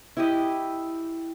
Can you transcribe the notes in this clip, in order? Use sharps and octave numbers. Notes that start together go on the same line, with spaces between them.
E4 G4 D#5